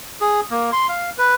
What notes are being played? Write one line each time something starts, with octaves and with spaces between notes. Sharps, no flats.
G#4
A#3
C6
F5
B4